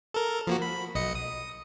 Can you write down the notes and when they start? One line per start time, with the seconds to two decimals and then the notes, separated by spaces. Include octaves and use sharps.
0.14 A4 A#4
0.47 F3 A#3 F#4
0.62 B5
0.95 B1 D#5 C#7
1.15 D#6